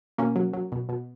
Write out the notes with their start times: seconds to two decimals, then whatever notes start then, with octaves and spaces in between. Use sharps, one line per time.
0.18 B2 A#3 C#4
0.36 F#3
0.53 F#3
0.72 B2
0.89 B2